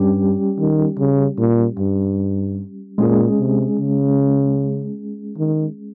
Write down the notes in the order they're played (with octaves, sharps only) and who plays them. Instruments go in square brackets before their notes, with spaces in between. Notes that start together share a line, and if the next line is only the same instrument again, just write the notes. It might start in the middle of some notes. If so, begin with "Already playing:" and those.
Already playing: [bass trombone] G2 [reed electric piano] G3 C#4 G4
[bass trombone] D#3
C#3
A#2
G2
[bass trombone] A#2 [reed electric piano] G#3 C#4 G#4
[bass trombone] C3
C#3
D#3